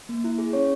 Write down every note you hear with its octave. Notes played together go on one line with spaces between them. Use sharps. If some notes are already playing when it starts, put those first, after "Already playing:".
A#3
E4
G#4
C#4 C#5